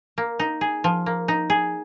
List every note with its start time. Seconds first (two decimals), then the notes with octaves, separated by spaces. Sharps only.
0.18 A#3
0.39 D#4
0.61 G#4
0.84 F3
1.06 A#3
1.28 D#4
1.50 G#4